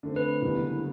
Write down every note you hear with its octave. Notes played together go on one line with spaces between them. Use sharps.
D3 A3 C4
B4
F#1 E2 D3 G3